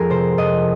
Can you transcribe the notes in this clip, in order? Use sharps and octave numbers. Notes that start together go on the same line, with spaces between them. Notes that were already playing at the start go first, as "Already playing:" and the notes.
Already playing: F2 G#3 G#4 A#4
C3 C5
F2 D#5